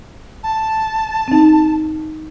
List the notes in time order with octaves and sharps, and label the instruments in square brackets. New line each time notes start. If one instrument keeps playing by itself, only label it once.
[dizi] A5
[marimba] C4 D#4